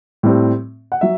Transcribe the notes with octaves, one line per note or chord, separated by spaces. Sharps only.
A2 G3 C4
F#5
F#3 E5